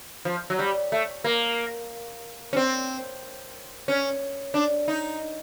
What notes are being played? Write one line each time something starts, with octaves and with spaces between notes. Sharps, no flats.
F3
F#3
G3
A3
A#3
C#4
C4
C#4
D4
D#4